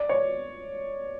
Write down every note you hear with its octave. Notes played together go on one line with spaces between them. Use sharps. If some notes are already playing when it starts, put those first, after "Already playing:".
Already playing: D5
C#5